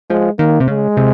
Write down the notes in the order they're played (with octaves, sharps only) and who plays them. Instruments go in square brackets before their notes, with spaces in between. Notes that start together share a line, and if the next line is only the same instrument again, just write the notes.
[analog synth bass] F3 [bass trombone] G#3
[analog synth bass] D#3 [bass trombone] A#3
[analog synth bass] C3
[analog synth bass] C#3 [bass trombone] G#3
[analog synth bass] C3